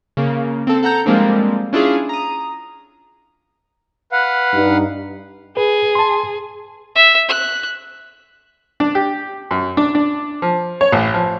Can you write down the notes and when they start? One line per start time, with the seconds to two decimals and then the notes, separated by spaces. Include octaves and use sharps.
0.17 C#3 A#3
0.67 C4 A4
0.83 A4 F#5 A#5 G6
1.06 F3 G3 G#3 A#3 C4 D4
1.73 C#4 D4 E4 F4 G#4
2.09 A#5 D#6
4.12 B4 F5 F#5
4.54 G2 D#4
5.57 G#4 B4
5.95 A5 C6
6.95 E5
7.29 F#6
8.80 D4
8.95 G4
9.51 F#2
9.77 D4
9.95 D4
10.42 F3
10.81 C#5
10.92 A1
11.14 F3